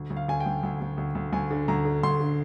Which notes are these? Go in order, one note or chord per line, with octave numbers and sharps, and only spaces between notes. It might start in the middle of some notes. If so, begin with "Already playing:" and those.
Already playing: D2
D2
F5
D2 G#5
G5
D2
D2
D2
D2
D2
D2 G#5
D3
D2 A#5
D3
D2 C6
D3